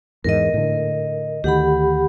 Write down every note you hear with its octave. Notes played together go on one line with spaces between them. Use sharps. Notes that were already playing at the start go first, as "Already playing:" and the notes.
E2 G#2 E3 A#4 D#5
A2 D3
D2 D#3 G4 F#5 B5